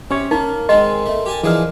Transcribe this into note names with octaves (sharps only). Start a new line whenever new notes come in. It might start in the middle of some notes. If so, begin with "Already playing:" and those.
C3 C#4 C#5
A#3 D#4 A#4
D#3 G#3 C4 D#5 C6
A3
G4 G#5 A5
E3 F3 D4 D#4 G#4 F6